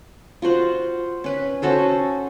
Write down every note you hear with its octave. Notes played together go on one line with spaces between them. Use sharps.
F4 F#4 C5 F#5
C#4 B4
C#4 F#4 A4 C5